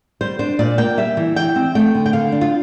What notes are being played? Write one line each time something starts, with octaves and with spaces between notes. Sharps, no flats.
G3 C5
D4 C5
A#2 D5
A#3 G5
G3 E5
E3
E3 G5
C4
A3 G5
D3
G5
D3 F5
D4
F4